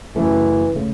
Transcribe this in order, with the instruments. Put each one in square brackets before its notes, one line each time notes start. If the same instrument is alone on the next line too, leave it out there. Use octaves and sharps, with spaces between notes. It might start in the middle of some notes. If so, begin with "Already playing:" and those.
[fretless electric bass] F#2 C#3 A3 [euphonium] E3
[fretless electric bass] C#3 A3